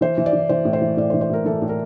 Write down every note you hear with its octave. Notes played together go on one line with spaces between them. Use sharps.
E3 C5
E3
D5
E3
E3 C5
A2
C5
E3
A2 D5
C5
E3
C5
A2 A#4
E3 A4
A2
A#4